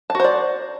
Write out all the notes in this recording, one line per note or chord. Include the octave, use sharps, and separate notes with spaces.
F#4 C5 D5 A5